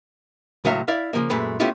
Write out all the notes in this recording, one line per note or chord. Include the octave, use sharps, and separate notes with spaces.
C#2 A2 F#3 C#5 E5 F5
E4 D5 E5 F5
C#3 F3 A#3
F#2 A#2 G#3 A3 B4
A3 B3 C#4 E4 F4 G4